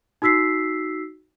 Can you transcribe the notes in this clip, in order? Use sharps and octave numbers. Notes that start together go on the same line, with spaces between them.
D#4 F#4 E6 B6 C7